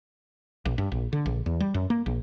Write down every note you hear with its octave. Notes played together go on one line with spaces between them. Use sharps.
A#1
G2
A#1
D3
A#1
E2
G3
F#2
A#3
A#1